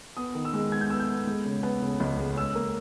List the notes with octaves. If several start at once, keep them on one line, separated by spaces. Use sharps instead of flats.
B3 D#6
D#3
E6
G#3
B3 G#6
G6
B3 E6
G6
B3
G#3
C#3
B3
C#3
C#2
G#3
C#4 E6
A#3